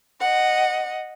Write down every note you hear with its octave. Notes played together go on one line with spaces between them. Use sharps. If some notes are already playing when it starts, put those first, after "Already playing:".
D#5 F#5